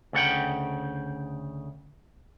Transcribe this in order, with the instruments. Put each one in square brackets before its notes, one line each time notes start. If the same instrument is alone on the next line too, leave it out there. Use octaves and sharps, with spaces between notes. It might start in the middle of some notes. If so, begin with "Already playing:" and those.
[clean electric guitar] D2 C#3 F#5 G5